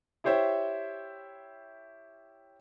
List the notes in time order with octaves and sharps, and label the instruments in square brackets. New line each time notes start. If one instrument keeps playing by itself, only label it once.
[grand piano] E4 G4 C5 C#5 E5 G5